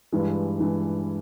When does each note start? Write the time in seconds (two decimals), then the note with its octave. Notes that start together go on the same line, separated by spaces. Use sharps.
0.12 G2 E3 G#3
0.60 G2 E3 G#3